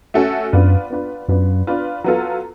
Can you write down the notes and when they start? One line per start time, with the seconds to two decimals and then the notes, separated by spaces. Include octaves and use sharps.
0.14 A3 C#4 F#4 A4
0.52 F#2 B3 D4 F4 B4
0.90 B3 D4 F4 B4
1.28 F#2 B3 D4 F4 B4
1.67 B3 D4 F4 B4
2.04 F#3 B3 F4 A4